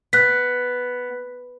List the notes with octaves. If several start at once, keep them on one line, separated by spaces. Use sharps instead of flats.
B3 F#6 B6